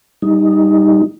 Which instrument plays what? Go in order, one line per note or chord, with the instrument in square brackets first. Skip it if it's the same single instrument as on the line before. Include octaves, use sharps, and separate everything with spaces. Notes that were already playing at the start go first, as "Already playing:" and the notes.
[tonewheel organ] G3 D#4